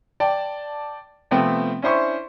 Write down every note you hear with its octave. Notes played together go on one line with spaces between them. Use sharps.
D5 G5 A5
C3 F3 A3 B3 C4
C#4 D4 E4 C5 C6 C#6